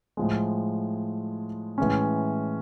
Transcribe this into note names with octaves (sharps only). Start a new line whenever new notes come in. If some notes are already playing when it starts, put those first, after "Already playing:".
A2 F3 G#3
A2 E3 G#3 C#4